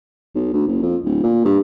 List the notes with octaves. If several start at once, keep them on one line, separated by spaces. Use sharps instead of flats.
B1
D2
F#1
F2
D1
A#2
G2